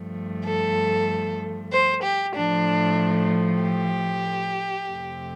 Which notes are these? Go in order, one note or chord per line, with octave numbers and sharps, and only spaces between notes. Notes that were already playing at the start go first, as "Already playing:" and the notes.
Already playing: G2 F3 A3
A4
C5
G4
A2 F3 A3 D4
G4
F2 C3 A3